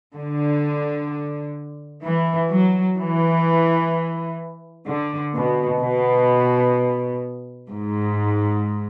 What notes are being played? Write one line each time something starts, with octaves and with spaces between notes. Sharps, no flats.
D3
E3
F#3
E3
D3
B2
B2
G#2